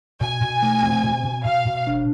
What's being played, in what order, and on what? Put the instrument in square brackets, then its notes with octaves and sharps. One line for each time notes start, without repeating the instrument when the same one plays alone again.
[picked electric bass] B2 [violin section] G#5
[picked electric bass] B2
A3
C4
B2
B2
[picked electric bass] B2 [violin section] F5
[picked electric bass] B2
D4